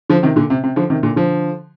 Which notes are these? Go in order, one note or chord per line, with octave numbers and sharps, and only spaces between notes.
D3 F3
C3 D#3
A#2 D3
C3
C3
D3 F3
C3 D#3
A#2 D3
D3 F3